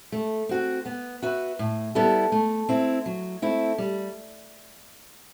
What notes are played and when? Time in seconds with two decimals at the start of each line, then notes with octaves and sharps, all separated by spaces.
0.12 A3
0.49 C4 F#4
0.86 B3
1.22 F#4 B4 E5
1.59 A2
1.95 G3 B3 E4 A4
2.32 A3
2.69 C4 E4
3.06 F#3
3.42 A3 C4 E4
3.78 G3